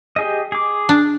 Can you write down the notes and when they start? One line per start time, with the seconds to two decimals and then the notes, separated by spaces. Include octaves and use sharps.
0.16 G4 G#4 D#5
0.52 G#4 D6
0.89 D4